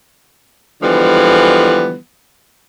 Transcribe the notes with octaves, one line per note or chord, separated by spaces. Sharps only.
D3 E3 F3 G3 G#3 B3